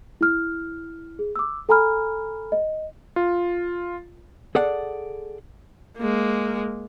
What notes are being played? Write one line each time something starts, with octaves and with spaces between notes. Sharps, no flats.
E4 F6
G#4
D6 E6
A4 G#5 A#5 B5 F6
D#5
F4
G#4 A4 D5 F#5
G#3 A#3